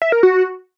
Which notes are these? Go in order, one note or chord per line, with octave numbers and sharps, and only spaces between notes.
E5
A#4
F#4